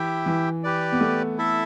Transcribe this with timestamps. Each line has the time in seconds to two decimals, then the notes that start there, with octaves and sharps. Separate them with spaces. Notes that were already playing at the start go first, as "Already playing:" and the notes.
Already playing: E3 E4 G4 E5 G5
0.26 E3
0.64 G4 B4 D5
0.92 B3
1.01 A3
1.38 E4 A4 E5